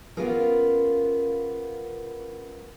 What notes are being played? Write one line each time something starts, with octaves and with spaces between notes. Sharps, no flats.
A#3 B3 C#4 F4 G#4 A#4